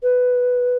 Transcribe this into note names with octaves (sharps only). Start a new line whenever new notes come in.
B4